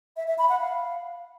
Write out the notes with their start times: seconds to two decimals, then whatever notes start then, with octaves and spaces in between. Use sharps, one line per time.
0.17 E5
0.27 E5
0.38 B5
0.49 F#5
0.60 F5